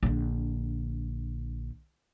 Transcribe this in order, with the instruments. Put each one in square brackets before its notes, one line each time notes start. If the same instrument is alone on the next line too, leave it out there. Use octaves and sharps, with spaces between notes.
[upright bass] A#1 D3